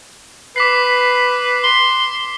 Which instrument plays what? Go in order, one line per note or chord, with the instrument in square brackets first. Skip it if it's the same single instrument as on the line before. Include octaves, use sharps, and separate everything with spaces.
[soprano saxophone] B4 [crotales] D6 B6 C7
[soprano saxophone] C6 [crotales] B6 G7